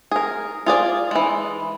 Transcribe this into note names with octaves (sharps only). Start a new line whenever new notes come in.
G#4 A#4
F4 G#4 D5
E3 G#3